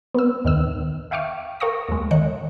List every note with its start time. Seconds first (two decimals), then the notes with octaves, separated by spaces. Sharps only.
0.14 B3 C4 E6
0.45 D#2 D#3 E6
1.11 E5 F5 G5 C#6 D6 F6
1.60 A#4 F5 G5 C#6 D#6 A#6
1.89 D#2 G#3
2.11 D#3 C#5 D#5 F#6 C#7